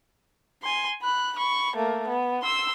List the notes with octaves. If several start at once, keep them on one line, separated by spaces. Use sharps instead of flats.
G#5 C6
B5 F#6
B5 C#6
A3 A#3
B3
C6 E6